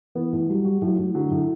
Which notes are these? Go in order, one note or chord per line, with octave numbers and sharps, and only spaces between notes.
E3 B3
A2
F#3 G3
F#4
A2 F#3
A2
D3 F#3
A2